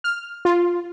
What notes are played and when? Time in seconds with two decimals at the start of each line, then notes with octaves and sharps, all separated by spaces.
0.04 F6
0.45 F4